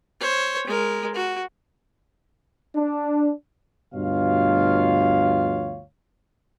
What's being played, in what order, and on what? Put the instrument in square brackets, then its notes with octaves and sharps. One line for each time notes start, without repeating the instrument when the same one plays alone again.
[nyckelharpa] C5 C#5
G#3 A#4
F#4
[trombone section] D4
[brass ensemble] D2 G2 B2 F4 C#5 F5